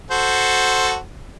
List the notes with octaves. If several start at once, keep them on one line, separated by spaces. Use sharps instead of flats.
F#4 A4 C5